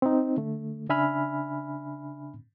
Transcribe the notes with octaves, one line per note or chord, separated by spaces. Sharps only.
C4 D#4
D3 A3
C#3 D4 E5 G#5 B5 F6